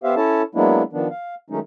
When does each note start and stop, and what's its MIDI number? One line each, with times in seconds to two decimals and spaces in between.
0.04 0.15 59
0.04 0.15 67
0.04 0.15 72
0.04 0.15 76
0.04 0.15 77
0.16 0.42 61
0.16 0.42 64
0.16 0.42 69
0.16 0.42 73
0.16 0.42 81
0.55 0.83 54
0.55 0.83 56
0.55 0.83 58
0.55 0.83 59
0.55 0.83 62
0.55 0.83 64
0.93 1.08 51
0.93 1.08 53
0.93 1.08 59
0.93 1.08 62
1.10 1.35 77
1.50 1.59 51
1.50 1.59 54
1.50 1.59 56
1.50 1.59 57
1.50 1.59 61
1.50 1.59 63